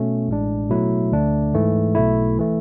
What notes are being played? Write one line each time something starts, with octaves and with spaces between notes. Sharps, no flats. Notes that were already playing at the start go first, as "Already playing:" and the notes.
Already playing: B2 A3 C#4
A1 A2 G#3 D4
B2 F#3 A3 E4
D2 D3 A3 D4
G#2 E3 A3
B1 B2 A3 E4
E3 A3